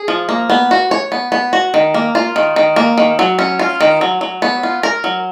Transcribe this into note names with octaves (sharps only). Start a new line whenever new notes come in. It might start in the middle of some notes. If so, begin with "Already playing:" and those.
Already playing: G#4
F3
A#3
B3
F#4
C#5
B3
B3
F#4
D#3
A#3
F4
D#3
D#3
A#3
D#3
F#3
C#4
F4
D#3
F#3
F#3
B3
F4
A#4
F#3